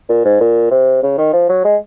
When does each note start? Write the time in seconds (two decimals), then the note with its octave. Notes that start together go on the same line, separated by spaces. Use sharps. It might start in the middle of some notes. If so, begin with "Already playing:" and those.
0.09 A#2
0.25 G#2
0.40 A#2
0.71 C3
1.03 C#3
1.18 D#3
1.33 F3
1.49 F#3
1.65 G#3